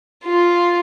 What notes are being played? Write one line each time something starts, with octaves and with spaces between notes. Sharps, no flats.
F4